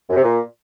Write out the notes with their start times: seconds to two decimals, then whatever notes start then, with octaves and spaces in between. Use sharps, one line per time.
0.10 F#2
0.16 C3
0.23 A#2